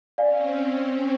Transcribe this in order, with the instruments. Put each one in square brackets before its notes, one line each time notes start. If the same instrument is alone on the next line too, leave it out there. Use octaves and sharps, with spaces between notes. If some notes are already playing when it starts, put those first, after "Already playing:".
[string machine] C4 C#4 [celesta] D5 F5 G#5